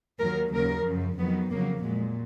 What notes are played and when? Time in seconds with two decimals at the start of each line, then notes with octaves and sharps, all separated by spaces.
0.19 D#2 D#3 F#3 A#4
0.53 D#2 C#3 F#3 A#4
0.85 F#2 F3
1.18 F2 D#3 F#3 B3
1.51 F2 C#3 F#3 A#3
1.83 A#2 F#3 G#3